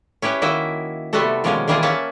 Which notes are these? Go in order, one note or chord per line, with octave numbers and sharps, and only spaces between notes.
C#4 E4 G4 B4 C#5
D#3 A#3 E4 F#4 D#5 E5
C3 G3 A3 B3 F#4 A4
B2 D#3 F3 G#3 A#3 C#4
D#3 E3 G3 A#3 F4 G#4
A#3 C#4 E5 F#5 A5